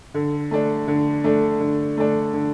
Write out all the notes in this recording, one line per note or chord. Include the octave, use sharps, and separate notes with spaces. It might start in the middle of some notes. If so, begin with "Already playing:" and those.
D3
A3 D4
D3
A3 D4
D3
A3 D4
D3